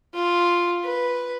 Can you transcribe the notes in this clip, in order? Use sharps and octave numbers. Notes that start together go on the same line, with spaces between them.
F4
B4